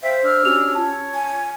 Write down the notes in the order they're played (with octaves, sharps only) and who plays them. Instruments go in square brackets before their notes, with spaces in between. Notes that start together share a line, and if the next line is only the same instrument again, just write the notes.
[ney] C5 [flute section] E5 F5 G5
[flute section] D4 E6 F6
[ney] C#4 [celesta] F#4 G4 F7
[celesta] F4 A5 [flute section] C#5
[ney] G#5